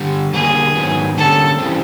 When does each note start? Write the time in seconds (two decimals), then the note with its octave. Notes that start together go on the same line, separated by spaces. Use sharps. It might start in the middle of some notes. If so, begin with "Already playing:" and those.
Already playing: D3 G3
0.33 D3 G3 A#3 G#4
0.75 G#2 D#3 F#3 B3
1.17 D3 G3 A#3 C#4 A4
1.58 C#3 E3 G3 C4